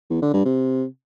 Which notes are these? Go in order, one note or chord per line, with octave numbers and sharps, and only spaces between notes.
E2
D3
G2
C3